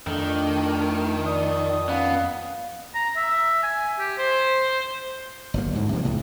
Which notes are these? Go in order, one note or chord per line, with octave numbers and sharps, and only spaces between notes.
F2 D#3 A3 D4
D5 D#6
B3 C#4 F5
A#5
E5
G#5
G4
C5
G1 F#3 A#3
D2 G#2
C3 F3 A3 A#3
C#2 A2 C#3